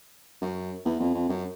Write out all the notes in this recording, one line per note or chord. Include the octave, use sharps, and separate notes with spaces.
F#2
E2
F2
F2
F#2